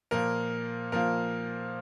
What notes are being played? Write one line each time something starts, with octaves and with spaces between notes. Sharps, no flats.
A#2 F3 A#3 A#4
A#2 F3 A#3 A#4